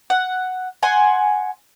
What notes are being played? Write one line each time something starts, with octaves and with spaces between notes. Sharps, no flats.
F#5
F#5 G#5 C6